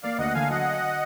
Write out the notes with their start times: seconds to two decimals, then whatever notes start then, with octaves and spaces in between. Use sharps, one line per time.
0.03 A#3 D5 F5
0.18 D2 D#5 F#5
0.34 D3 F5 G#5
0.50 F#3 D#5 F#5